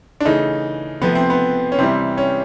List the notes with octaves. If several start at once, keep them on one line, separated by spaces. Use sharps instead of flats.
D4
C#3 E3 A3 D#4
C3 F3 A3 B3
C4
B3
C#4
C3 E3 G3 C4
C#4